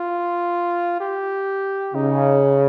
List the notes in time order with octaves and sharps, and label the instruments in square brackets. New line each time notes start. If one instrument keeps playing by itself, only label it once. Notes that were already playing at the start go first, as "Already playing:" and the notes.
Already playing: [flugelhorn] F4
G4
[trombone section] C#3 [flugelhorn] D#4